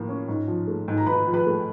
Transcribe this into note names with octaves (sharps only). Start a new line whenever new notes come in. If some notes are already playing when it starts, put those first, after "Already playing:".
Already playing: A2 F3 A#3
C#4
G#2
F3
A3
G#2
A#5
G#2 B4 B5
F3
B4 B5
A3